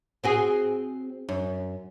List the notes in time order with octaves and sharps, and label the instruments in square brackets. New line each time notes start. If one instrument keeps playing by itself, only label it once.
[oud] C4 F#4 G#4
F#2